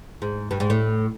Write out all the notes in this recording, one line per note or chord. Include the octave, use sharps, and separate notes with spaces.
G#2
G2
G#2
A2